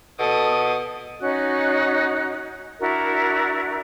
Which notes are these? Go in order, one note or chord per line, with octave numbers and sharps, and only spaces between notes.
B2 A4 D#6
C#4 D#4 F#4 F#6
D4 E4 F#4 A#4